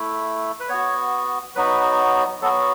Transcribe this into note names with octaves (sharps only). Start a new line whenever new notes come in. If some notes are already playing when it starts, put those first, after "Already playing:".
Already playing: A3 E4
B4
B3 F#4 C#5
F#3 B3 D#4 F#4 B4
F#3 B3 F#4 A4